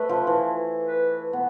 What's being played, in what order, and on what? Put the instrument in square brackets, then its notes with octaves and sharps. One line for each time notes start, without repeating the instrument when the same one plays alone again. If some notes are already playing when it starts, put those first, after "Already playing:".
Already playing: [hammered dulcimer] A3 [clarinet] B4
[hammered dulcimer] F3
E3
[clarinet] B4
[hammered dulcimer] B3